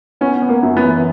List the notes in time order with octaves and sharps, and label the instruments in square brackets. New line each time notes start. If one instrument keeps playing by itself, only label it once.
[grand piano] B3 [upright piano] C#4
[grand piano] B3
[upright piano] A#3
[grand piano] F#2
[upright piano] B3
[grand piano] E3